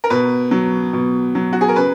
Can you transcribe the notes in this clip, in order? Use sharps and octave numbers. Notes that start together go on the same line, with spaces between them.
A#4
B2 B4
F#3
B2
F#3
F#4
G#4
A#4
C#3 B4